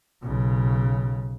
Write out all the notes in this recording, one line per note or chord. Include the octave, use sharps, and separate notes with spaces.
B1 C#3